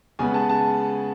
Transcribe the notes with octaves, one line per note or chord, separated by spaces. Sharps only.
C#3 G#3 B3 G#5
A5
A5